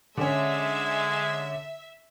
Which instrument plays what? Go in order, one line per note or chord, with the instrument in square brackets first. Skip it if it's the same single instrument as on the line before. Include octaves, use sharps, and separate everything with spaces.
[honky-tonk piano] D3 C#4 [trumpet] G#3 [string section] E5